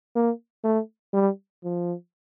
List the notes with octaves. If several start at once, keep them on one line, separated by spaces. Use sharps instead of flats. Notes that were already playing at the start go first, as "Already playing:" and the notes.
A#3
A3
G3
F3